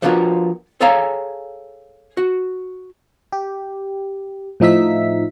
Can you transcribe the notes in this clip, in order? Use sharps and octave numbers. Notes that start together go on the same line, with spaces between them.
F3 B3 D4 F4 F#4 A#4
G#4 A4 C#5 F5 G#5 A#5
F#4
G4
A2 F3 D#4 E5 B6